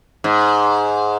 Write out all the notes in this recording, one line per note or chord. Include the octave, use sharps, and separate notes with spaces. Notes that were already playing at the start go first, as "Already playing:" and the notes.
G#2